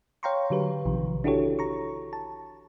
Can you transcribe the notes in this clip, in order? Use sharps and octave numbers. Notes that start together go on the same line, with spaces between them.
C#5 F5 G5 A#5 C6 C#6
D3 F#3 G4 B4
A#1 C3 D#3 F3
D4 E4 F#4 G4 A4 C#5
A#5 C#6
A5